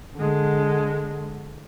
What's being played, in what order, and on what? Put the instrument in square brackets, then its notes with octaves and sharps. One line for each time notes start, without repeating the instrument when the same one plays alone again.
[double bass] D3 G#3